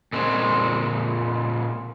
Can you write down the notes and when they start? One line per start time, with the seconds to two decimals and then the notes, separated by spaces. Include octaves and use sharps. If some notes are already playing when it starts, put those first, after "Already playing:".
0.13 A#2 G#3 C4